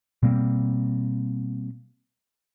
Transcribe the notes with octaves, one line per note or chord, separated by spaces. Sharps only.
B2 G3 A#3 C4